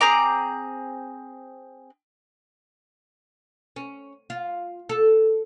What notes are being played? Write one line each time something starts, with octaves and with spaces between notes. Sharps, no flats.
C4 G#4 A#5 D6
C#4
F4
A4